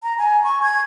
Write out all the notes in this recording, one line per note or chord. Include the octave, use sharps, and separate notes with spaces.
A#5
G#5
C#6
G#6